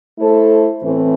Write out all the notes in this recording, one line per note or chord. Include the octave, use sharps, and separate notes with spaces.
A3 E4 A4 C5
A2 E3 A3 C4